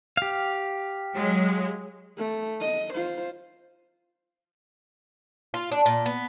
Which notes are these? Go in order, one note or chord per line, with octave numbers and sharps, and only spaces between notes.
G4 F5
F#3 G#3
A3
D#5
F4 C5
F4
D4
A#2
B3